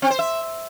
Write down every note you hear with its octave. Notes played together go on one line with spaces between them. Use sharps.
C4
C5
E5